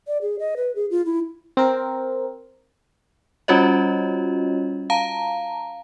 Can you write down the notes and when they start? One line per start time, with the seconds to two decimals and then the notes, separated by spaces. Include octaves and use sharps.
0.07 D5
0.22 G#4
0.39 D#5
0.57 B4
0.76 G#4
0.91 F4
1.06 E4
1.57 C4 A#4
3.48 G3 C#4 F4 F#4 C#5 D#5
4.90 F5 A5 A#5